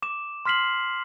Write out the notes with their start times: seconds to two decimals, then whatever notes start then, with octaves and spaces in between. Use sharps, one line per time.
0.02 D6 E7
0.45 C6 F6 B6 C7 F#7